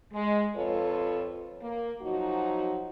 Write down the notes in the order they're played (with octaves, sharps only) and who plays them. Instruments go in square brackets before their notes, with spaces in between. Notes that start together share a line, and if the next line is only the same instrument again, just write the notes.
[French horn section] G#3
F2 F4 A4 B4 C#5
A#3
F3 F#3 D#4 F#4